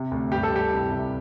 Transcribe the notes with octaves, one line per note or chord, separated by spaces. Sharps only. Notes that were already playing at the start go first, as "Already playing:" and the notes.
Already playing: C3
D2
G2 G4
A4
G2 G4
C2
C3